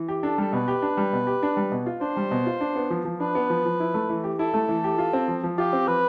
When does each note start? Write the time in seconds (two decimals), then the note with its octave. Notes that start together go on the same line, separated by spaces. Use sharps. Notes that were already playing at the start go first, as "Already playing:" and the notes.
Already playing: E3
0.09 G4
0.23 D4 A4
0.38 G3 A4
0.53 B2 B4
0.68 G4
0.82 D4
0.97 G3
1.13 B2
1.27 G4
1.43 D4
1.57 G3
1.72 B2
1.86 F4
2.01 D4 C5
2.17 G3
2.31 B2
2.46 F4
2.61 D4
2.76 B3
2.90 F3
3.05 F3
3.20 D4 B4
3.35 B3
3.50 F3
3.65 F3
3.80 E4
3.94 A3
4.10 E3
4.24 G4
4.39 E4 A4
4.54 A3
4.69 E3
4.84 G4
4.98 F4
5.13 C4
5.28 F3
5.43 F3
5.58 F4 G4
5.73 C4
5.87 F3 B4